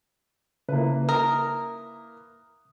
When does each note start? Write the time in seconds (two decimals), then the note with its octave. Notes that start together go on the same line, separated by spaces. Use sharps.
0.69 C#3 A#3 E4 B4
1.09 A#4 D#6